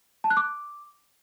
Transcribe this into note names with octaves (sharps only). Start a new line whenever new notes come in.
A5
F#6
D6